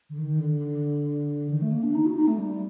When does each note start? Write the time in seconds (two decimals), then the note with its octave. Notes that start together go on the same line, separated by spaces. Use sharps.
0.10 D3
0.18 D#3
0.39 D3
1.50 D#3
1.61 A3
1.72 A#3
1.83 D4
1.94 D#4
2.06 F#4
2.16 D#4
2.27 A3
2.38 G3